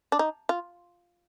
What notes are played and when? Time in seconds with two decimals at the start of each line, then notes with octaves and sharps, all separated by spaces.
0.12 D4
0.19 D#4
0.49 F4